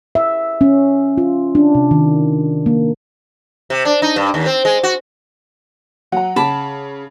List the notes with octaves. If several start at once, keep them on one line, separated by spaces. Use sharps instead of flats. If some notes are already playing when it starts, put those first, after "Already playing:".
E5
C#4
F4
D4
C3
D#3
A#3
C3
D4
D#4
G2
D#2
C4
G#3
F#4
F#3 F#5 A#5
C#3 A5 B5 D6